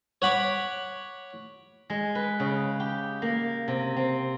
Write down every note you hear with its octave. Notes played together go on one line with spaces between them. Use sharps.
C#5 F#5 B5 D6
G#3
B4
C#3
G4
A#3
C3
C4